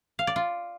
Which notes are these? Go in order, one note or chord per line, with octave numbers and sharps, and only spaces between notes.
F5
D5
F4